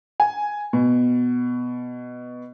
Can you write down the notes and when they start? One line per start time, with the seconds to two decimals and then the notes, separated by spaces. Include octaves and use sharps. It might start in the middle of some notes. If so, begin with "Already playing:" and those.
0.20 G#5
0.73 B2